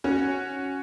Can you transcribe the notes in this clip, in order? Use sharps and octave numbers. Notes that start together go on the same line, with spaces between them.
C#4 F#4